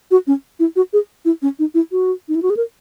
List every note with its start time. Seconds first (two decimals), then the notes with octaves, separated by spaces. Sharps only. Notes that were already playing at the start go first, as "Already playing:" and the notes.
0.11 F#4
0.27 C#4
0.60 E4
0.76 F#4
0.93 G#4
1.25 E4
1.42 C#4
1.59 D#4
1.74 E4
1.92 F#4
2.29 D#4
2.35 E4
2.43 F#4
2.50 G#4
2.57 A#4